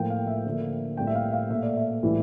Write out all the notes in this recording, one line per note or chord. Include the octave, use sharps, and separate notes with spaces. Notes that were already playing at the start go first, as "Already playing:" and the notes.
Already playing: A2 F3 A#3 G5
F5
E5
D3 F3 A#3
A2 G3 A#3 G5
E5
F5
F5
A#2 A3 E5
D5
E5
A2 E3 G3